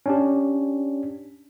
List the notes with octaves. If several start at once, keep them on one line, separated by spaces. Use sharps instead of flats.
C#4 D4 G4